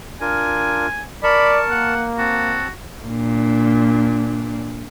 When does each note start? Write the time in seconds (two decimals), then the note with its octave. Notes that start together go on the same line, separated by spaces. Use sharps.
0.21 D4 F4 A#4 G#5
1.24 A#4 D5 A5 B5 C#6
1.70 A#3 F#5
2.19 C4 F#4 A5
3.07 A#2 D4